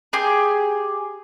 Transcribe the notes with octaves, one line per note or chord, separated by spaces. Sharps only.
G4 G#4